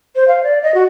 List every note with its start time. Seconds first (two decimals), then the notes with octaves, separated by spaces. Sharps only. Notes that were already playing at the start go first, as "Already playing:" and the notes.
0.16 C5
0.28 F5
0.43 D5
0.63 D#5
0.74 F#4